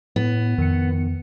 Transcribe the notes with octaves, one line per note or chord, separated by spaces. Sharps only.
A2 B3
F2 D#3 C#7